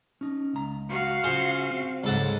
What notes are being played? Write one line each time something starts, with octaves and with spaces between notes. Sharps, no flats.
C#4 D#4
C#2 A#5
F#4 F5
C#3 F4 G#4 C5 G#5
C4
C#2 G#2 A4 F#5